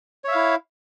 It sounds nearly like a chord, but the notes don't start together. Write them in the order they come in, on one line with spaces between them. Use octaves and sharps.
C#5 E5 F5 E4